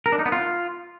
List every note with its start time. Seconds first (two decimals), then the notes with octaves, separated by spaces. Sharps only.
0.06 A#4
0.12 D4
0.19 D#4
0.26 B3
0.32 F4